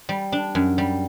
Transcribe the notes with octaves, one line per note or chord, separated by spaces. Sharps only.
G3
D4
F#2
G3